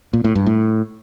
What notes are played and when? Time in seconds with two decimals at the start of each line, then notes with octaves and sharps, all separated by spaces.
0.13 A#2
0.24 A2
0.35 G2
0.46 A2